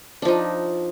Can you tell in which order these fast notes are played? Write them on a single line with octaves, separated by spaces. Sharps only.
D4 F3 D#4